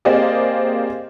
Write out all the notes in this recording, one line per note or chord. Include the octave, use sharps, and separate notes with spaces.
A#3 C4 G4 G#4 D5 D#5